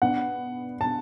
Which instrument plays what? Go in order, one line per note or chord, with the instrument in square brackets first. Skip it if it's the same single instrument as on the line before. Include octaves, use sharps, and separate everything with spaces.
[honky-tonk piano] B2 B3 D4 [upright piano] F#5
[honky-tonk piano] B2 B3 D4 [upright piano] A5